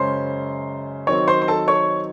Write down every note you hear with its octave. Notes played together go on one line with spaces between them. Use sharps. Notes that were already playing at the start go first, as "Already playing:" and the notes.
Already playing: F#2 C#3 G#3 C#4 C5 C6
D#3 F#3 C4 D#4 C#5 C#6
C5 C6
C6
A4 A5
C#5 C#6